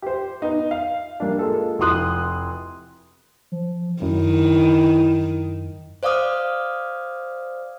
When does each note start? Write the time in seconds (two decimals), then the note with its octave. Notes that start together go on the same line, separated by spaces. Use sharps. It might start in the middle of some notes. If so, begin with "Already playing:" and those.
0.02 G4 C5
0.42 B3 D#4
0.71 F5
1.20 G3 A#3 D4
1.39 G#3 A#3 F4 G#4 A4
1.79 F1 E4 F#4 C6 D#6 F#6
3.52 F3
4.02 F#2 D#3 E4
6.03 C5 D5 F5 D6 D#6 F6